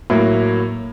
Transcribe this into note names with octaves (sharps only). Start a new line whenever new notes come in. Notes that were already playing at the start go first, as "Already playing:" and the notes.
A2 F#3 A#3